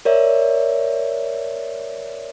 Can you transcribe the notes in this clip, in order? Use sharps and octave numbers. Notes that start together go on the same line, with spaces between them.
A#4 C#5 D5 E5